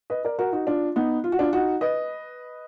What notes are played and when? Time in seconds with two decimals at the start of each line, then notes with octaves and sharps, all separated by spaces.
0.10 B4 D#5
0.25 A#4 D5
0.39 F#4 A#4
0.53 D#4 F#4
0.67 D4 F4
0.96 B3 D#4
1.24 F4
1.32 F#4
1.39 D4 F4
1.53 D#4 F#4
1.81 B4 D#5